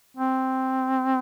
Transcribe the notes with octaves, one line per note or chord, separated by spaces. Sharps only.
C4